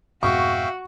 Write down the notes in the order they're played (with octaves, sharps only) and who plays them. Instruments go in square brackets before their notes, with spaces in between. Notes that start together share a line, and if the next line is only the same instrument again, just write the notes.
[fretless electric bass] F2 G#2 B2 [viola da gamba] F#4 [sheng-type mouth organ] E5 F5 G5 [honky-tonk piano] C#6